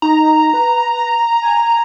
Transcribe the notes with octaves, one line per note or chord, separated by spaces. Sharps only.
D#4 A#5
B4
G#5